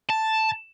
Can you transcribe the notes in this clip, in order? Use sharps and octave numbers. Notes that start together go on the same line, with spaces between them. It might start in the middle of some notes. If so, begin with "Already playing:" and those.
A5